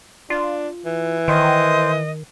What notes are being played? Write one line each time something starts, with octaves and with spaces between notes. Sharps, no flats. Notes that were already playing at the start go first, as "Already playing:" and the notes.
D4 F4
E3
D#3 C5 D#5